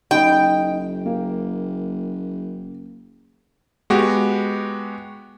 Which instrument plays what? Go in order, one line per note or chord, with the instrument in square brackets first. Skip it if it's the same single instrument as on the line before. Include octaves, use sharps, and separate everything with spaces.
[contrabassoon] F#1 [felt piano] D#4 [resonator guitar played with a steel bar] G5
[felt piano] A#3
[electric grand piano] G#3 B3 F#4 G4